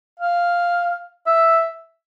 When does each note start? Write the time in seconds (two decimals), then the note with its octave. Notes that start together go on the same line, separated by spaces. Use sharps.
0.20 F5
1.26 E5